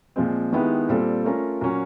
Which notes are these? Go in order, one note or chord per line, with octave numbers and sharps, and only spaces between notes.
A#2 F3 G#3 C4
D#3 G#3 B3 E4 G4
A#2 G3 C4 F4 A4
A3 C#4 F4 A#4
A#2 F#3 A#3 C#4